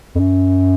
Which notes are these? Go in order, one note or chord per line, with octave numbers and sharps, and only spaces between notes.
F2
F#2